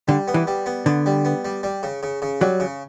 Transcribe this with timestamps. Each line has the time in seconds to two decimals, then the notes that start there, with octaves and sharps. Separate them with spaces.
0.08 D3 G3
0.28 B3
0.34 E3
0.47 G3
0.66 B3
0.86 D3 B3
1.06 G3
1.25 B3
1.45 G3
1.63 G3
1.83 C#3
2.03 C#3
2.22 C#3
2.41 F#3 G3
2.60 C#3